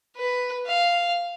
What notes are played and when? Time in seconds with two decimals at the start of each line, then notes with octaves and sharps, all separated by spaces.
0.17 B4
0.67 F5